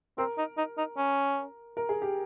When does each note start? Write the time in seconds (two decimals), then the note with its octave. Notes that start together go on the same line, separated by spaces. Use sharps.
0.18 C4 A#4
0.38 D#4
0.57 D#4
0.78 D#4
0.97 C#4
1.77 A#4
1.89 G#4
2.02 G4